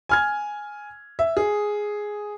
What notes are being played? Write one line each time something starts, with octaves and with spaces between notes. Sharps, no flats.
G#5 F6 G#6
E5
G#4